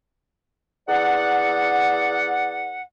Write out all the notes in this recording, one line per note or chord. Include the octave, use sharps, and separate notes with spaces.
E2 D5 F#5